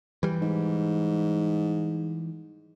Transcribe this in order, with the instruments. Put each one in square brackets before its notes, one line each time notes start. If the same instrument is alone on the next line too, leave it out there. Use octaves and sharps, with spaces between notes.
[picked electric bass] E3 G3
[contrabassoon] G#2